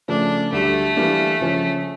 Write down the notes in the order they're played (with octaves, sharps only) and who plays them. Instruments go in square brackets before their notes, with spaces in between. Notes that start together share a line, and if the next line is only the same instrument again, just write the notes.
[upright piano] C#3 F3 A3 [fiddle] D4
[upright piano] D2 D3 G3 [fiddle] A3
[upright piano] E3 G3 A#3 D4
C#3 F3 C#4